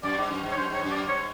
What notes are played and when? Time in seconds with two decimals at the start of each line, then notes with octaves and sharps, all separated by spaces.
0.03 F#2 D5
0.18 G2
0.31 F#2
0.43 G2
0.51 C#5
0.56 F#2 C5
0.70 G2 C#5
0.83 F#2
0.91 D5
1.08 G2 C#5